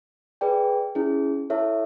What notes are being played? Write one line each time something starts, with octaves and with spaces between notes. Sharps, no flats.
G#4 B4 D5 G5
C#4 E4 G#4
E4 A4 C#5 E5